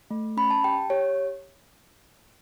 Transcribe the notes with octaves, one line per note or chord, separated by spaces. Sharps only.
A3
C#4 B5
A5
G4 G5
G4 C#5